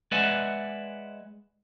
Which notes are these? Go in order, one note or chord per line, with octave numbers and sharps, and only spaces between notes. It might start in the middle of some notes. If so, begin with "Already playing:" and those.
G#3 B4 D5 E5 F#5 G#5